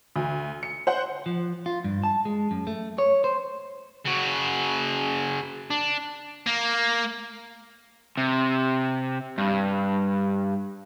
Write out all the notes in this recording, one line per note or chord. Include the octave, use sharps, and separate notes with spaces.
D2
C#7
C5 F#5
F3
F4
G2
A5
G#3
F#2
A3
C#5
C5
C#3 F#4
D4
A#3
C3
G2